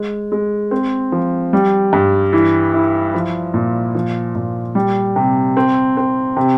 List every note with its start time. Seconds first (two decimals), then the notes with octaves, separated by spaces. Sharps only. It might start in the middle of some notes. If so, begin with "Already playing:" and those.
Already playing: G#3
0.32 G#3
0.71 C4
1.12 F3
1.53 G3
1.93 G2
2.33 E3
2.74 E4
3.14 F3
3.54 A#2
3.95 F3
4.35 A#2
4.75 G3
5.16 C3
5.57 C4
5.97 C4
6.37 C3